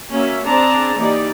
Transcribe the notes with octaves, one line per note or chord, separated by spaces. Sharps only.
A#3 C#4 F#4 E5
C4 D4 G#4 D5 A5 A#5
E3 A#3 D#4 G4 D5